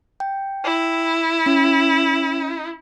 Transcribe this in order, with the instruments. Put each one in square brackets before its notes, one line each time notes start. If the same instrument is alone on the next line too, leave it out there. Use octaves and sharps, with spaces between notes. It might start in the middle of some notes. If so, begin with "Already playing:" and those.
[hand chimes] G5
[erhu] E4
[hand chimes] C#4